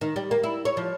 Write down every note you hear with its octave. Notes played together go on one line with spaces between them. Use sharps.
D#3
G3
A#3
E4
C#5
F3